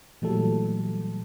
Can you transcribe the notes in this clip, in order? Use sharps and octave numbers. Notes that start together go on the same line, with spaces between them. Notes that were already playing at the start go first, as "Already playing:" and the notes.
A#2 E3 F#3 G3 A3 A4